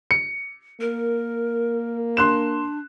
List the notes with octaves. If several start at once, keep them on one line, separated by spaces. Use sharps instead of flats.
C#7
A#3 A#4
D4 C6 F#6 E7